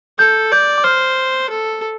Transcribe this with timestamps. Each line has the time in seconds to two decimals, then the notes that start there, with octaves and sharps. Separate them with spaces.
0.19 A4 G6
0.51 D5 G6
0.78 D6
0.84 C5 F6
1.50 A4